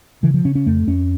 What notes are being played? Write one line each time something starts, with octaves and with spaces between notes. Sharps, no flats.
C#3 E3
F3
C#3 C#4
C#4
F2 A3
F2 C#4